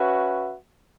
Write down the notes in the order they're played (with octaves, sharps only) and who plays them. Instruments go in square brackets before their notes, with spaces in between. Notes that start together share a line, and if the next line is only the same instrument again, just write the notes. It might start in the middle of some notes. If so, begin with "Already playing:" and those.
Already playing: [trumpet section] C#4 F#4 B4 E5